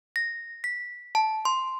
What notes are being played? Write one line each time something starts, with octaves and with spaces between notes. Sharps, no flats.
A#6
B6
A5
C6